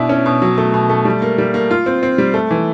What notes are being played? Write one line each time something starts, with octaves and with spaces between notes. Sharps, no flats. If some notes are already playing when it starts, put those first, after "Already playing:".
Already playing: B2 D4 E4
C#4
B2
F#3
A3
B2
A3
G3
A#3
G3
A#3
F4
C4
C4
G3
A3
E3